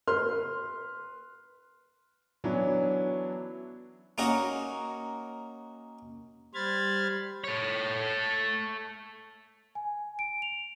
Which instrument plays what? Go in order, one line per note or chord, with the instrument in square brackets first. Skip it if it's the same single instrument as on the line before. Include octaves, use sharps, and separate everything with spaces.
[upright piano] B4 C6 F6
[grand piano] E3 F#3 B3 C#4 D4 E4
[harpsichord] A#3 C#4 D#4 F#4 A#4
[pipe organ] G3 C5 B5 F6 G#6 A6
[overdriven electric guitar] A4 C#5
[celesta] G#5
D7
F7